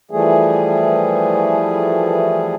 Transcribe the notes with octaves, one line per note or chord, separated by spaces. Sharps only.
E3 F3 G3 A3 G#4